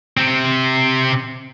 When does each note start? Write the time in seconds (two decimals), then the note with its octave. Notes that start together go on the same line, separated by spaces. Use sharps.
0.17 C3 C4